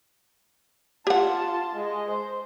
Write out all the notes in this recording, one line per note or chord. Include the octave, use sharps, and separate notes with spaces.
F4 G4 F#5 A5
G#3 D#5
C5